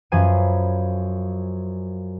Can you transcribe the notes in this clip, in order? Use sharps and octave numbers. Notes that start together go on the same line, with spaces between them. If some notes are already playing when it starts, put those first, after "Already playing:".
F#2 F3 B4 G#5 C7 D#7